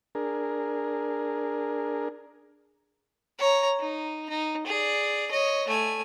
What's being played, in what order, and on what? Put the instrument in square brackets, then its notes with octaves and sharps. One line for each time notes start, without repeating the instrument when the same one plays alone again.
[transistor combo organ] D4 G#4 A#4
[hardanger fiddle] C#5 A#5
D#4
D#4
G#4 D5
C#5 D#5
A3 G#5